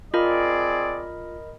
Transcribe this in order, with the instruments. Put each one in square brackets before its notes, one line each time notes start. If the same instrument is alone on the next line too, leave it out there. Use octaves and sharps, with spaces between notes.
[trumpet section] C4 G#4 D5 [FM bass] F4 [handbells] A#4 D#5 B5